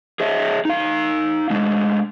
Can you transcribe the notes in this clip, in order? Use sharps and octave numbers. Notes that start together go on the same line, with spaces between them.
G#4 C#5 D#5 E5
D#4 F5
G#3 A3 D4